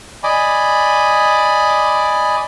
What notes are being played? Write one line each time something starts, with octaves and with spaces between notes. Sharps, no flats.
D5 D#5 G#5 B5 D6